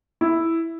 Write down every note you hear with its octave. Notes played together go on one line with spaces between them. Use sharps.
E4